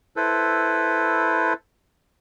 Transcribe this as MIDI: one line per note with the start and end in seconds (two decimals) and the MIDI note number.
0.16 1.53 64
0.16 1.53 69
0.16 1.53 71
0.16 1.53 72